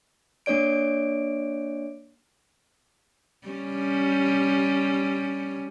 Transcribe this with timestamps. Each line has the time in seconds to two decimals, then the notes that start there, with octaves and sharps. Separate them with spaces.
0.46 A#3 D4 C#5 D5 D7
3.47 G3 C#4